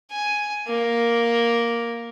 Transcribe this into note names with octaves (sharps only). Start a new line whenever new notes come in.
G#5
A#3